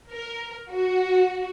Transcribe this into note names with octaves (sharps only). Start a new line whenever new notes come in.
A#4
F#4